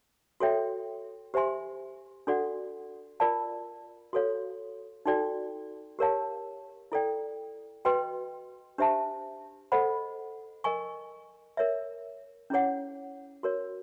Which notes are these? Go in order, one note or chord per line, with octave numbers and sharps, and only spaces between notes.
F#4 A4 C#5 E5 G5
G4 C5 E5 G#5 C6
D4 F#4 A4 D5 F#5
F4 A#4 D5 F5 A5
F#4 A4 C#5 F5
D#4 F#4 A4 D5 G5
G4 A#4 C#5 F5 A5
E4 A4 D5 G5
F#4 B4 D#5 G5 C6
D4 G4 C5 E5 A5
A4 C5 D#5 F#5 B5
A#4 D#5 G#5 C#6
A#4 C#5 E5
C#4 E4 G#4 C#5 F#5
F#4 A#4 C#5